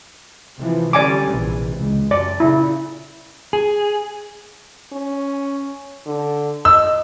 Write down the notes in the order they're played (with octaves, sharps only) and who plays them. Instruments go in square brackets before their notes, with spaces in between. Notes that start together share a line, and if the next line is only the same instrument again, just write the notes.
[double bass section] C3 E3 F3
[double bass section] D3 G3 C#4 [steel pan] D5 G#5 D6
[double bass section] A#1 C3 E3
C#2
[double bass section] F#2 [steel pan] D5
[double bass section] A#2 C#3 [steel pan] E4
[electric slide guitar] G#4
[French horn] C#4
D3
[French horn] D#5 [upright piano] E6